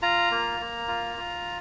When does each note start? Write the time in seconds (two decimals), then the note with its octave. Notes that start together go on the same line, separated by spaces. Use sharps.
0.02 F4 A#5
0.31 A#3
0.60 A#3
0.88 F4
1.17 F4